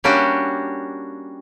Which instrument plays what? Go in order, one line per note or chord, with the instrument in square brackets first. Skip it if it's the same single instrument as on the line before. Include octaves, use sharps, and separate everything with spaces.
[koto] G3 A#3 C#4 D4 F#4 G4